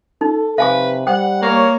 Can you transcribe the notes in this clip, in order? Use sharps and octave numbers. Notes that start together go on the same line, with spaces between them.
D#4 A4
C3 B4 F5 G#5 C#6
G3 C5 F#5 G5
A#3 A#4 C#5